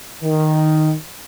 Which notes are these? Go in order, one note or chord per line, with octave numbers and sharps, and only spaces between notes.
D#3